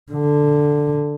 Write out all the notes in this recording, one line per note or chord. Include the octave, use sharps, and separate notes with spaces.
D3